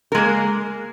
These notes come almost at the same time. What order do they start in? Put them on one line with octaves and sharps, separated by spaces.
A#4 G#3 A#3